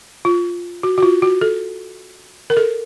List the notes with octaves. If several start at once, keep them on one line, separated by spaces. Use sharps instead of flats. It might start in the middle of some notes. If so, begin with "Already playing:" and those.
F4
F#4
F#4
F4
F#4
A4
A#4
A4